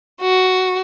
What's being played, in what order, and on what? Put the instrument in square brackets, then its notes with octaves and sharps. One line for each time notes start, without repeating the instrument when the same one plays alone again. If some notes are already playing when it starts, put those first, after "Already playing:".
[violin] F#4